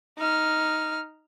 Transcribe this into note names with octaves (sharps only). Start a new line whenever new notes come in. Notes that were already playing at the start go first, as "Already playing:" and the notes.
D#4 F6